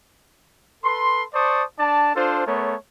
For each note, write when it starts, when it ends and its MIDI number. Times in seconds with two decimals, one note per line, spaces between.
0.84 1.23 69
0.84 1.23 71
0.84 1.23 84
1.34 1.63 72
1.34 1.63 74
1.34 1.63 81
1.34 1.63 85
1.34 1.63 87
1.79 2.15 62
1.79 2.15 74
1.79 2.15 81
2.15 2.46 62
2.15 2.46 65
2.15 2.46 69
2.15 2.46 72
2.46 2.75 57
2.46 2.75 59
2.46 2.75 70
2.46 2.75 73